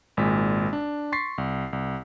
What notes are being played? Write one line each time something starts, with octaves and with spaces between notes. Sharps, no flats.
G#1 A#2 G#3 B6
D4
C6 C#6 A6 B6 C7
C2
C2